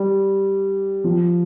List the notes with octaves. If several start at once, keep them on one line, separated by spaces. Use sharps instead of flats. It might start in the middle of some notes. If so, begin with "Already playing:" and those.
Already playing: G3
F3